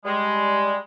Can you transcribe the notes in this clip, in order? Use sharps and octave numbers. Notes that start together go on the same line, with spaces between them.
G3 G#3